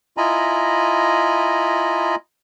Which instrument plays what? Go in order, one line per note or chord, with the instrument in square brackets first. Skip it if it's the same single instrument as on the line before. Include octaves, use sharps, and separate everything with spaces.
[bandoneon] E4 F4 D#5 G#5 A#5 B5